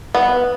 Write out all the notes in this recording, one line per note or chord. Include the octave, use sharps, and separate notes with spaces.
B3